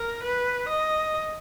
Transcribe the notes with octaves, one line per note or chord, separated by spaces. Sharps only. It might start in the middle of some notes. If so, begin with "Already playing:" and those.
Already playing: A#4
B4
D#5